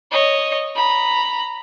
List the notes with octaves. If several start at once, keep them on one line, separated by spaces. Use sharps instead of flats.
C#5 D#5
A#5 B5